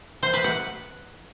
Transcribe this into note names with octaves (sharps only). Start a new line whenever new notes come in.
C5
B4
F#5